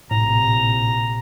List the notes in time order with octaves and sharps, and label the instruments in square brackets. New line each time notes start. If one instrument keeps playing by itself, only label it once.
[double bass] A#1 C3 [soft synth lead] A2 [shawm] A#5